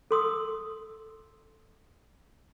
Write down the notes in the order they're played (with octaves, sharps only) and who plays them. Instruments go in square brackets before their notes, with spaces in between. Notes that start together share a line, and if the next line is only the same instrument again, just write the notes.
[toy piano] A4 C6 D#6 E6